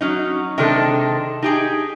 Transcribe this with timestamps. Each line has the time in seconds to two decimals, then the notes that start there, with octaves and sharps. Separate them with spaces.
0.01 F#3 C#4 D#4
0.58 C3 D#3 G#3 D4 D#4 A4
1.42 D#4 G4 G#4